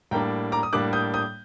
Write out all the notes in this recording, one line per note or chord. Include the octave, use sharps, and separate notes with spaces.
A2 G3 A#3 D4 G5 A#5
A#5 D6
D#6
A2 G3 A#3 D4 D6 F#6
D#6 G6
D#6 G6